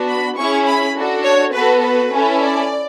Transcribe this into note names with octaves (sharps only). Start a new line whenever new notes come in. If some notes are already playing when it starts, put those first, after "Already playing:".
Already playing: B3 D4 F#4
B5
C#4 E4 G#4 C#6
B5
D4 F#4 A4
C#5
B3 F#4 A4 B4
B4
C#4 E4 A4
D5